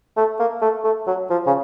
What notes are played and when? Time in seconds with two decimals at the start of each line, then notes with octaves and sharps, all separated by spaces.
0.17 A3
0.40 A#3
0.62 A3
0.84 A3
1.07 F#3
1.30 F3
1.46 C#3